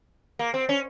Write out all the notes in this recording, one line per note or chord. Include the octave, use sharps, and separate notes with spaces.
A#3
C4
C#4